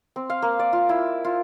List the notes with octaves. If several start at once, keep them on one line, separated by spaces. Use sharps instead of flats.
C4
F5
A#3
D5
F4
E4
F4